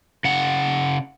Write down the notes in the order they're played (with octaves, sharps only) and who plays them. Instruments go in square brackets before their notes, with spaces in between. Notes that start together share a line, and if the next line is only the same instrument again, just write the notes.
[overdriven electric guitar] C#3 F#5